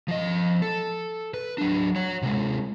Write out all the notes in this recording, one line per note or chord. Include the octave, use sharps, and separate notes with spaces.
F3 D#5
A4
B4
F#3 D4
C#5 F#5
C3 G#3